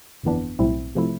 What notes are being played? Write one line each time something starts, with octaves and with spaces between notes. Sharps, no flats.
G1 F2 E3 B3 D4
B1 A2 G3 C4 E4
C3 F3 A3 E4